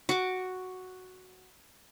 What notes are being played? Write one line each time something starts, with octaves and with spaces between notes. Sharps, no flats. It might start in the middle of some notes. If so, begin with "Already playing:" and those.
F#4 D6